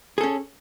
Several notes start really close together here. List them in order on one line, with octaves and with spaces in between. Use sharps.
G#4 A4 C#4